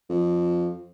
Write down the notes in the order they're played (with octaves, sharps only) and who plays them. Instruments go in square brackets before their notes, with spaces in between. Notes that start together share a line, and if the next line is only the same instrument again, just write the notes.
[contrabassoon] F2